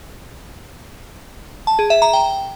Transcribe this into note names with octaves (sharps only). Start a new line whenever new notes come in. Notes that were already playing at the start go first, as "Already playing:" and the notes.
A5
G#4
E5
A#5
G5